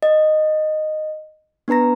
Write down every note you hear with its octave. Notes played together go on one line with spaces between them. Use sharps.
D#5
B3 D4 B4 A#5 A#6